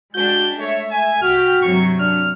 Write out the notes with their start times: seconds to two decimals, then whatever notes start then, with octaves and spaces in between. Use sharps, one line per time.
0.15 G#3 D4 F#4 G4 G6
0.60 A3 C#5 E5
0.91 G#5
1.22 C2 F#4 G4 F6 B6
1.62 G2 C3 F#3 C#6
2.00 D4 F6